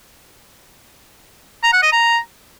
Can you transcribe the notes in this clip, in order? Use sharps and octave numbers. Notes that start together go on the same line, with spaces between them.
A#5
F#5
D#5
A#5